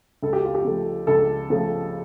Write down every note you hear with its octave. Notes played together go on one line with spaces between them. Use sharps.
C#2 A4
G4
F4
G4
C#3 F3 A3
C#2 A4
C#3 F3 A3